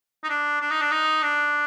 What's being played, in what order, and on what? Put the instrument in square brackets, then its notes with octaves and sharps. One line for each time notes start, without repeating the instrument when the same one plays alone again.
[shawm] D#4
D4
D4
D#4
D4
D#4
D4